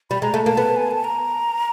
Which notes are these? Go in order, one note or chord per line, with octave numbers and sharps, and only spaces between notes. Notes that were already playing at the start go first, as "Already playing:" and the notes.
G3 B5
G#3 A#5
A3 A5
A#3 A5
B3
G#5
A5
A#5